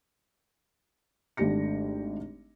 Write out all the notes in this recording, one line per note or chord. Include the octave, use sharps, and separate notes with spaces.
G#1 A3 D4 G4 A#6 C#7